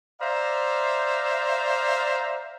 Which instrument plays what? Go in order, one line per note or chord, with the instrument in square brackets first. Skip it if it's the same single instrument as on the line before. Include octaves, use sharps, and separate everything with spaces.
[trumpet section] C5 D5 E5 F5 A#5